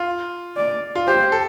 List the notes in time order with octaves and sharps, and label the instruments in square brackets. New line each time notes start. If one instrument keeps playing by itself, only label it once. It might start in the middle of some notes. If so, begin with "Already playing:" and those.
Already playing: [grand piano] F4
[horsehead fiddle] D5
[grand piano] F4
[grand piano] G4 [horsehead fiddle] C5
[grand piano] A4